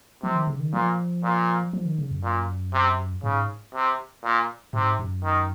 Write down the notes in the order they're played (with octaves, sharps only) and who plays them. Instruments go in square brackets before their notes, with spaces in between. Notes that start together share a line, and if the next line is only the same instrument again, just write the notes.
[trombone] C3 [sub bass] F3
[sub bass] D#3
C#3
D#3
[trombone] A#2 [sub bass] F3
[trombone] A#2
[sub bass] F3
D#3
C#3
F#2
[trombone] A#2
C3
[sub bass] G#2 [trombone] C#3
[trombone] C3
A#2
[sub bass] G#2 [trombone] C3
[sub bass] F#2
[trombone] D#3